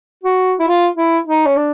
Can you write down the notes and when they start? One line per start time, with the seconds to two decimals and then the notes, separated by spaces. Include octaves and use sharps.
0.23 F#4
0.59 E4
0.68 F4
0.97 E4
1.27 D#4
1.46 C#4
1.56 D4